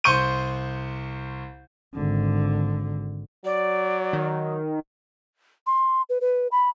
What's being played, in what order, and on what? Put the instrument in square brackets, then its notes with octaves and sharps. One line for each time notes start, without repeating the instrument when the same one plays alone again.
[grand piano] C2 C5 C6 C#6 G6 D#7
[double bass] G#1 D3
[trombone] F#3 [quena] D5
[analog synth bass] D#3
[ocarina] C6
B4
B4
B5